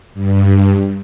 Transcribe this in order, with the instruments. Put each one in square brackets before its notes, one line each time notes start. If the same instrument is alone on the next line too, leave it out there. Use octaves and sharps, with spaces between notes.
[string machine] G2